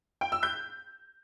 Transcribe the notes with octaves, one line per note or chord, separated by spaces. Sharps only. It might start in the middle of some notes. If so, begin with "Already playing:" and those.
G5
E6
G6